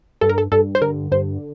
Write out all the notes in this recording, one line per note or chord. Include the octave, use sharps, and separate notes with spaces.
G2 A4
A#4
A4
G2 A4
C5
D3 A#4
G2 C5